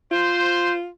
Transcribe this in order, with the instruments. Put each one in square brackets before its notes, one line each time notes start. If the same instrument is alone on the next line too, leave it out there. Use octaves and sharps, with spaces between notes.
[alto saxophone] F4 [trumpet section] C5